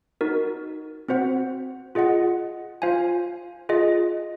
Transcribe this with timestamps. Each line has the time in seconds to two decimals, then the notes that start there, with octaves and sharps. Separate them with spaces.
0.21 D#4 F#4 A#4
1.09 C4 F#4 C5 F#5
1.95 F4 G#4 D#5 F#5
2.82 F4 C5 F5 G#5
3.69 F4 G#4 D#5